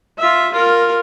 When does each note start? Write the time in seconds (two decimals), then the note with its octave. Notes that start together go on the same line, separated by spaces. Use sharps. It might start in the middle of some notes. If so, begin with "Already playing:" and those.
0.19 F4 E5
0.53 F4 A#4